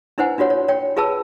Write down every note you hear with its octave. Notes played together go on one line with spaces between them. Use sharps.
D4 E4 B4 C5 F#5 G#5
D4 F4 F#4 C#5 F#5
C#5
C#5 G5
F4 G#4 B4 A5 E6